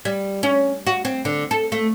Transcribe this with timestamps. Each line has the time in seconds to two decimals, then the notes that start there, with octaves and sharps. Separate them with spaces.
0.05 G3
0.43 C#4
0.87 F#4
1.05 C4
1.25 D3
1.51 A4
1.72 A3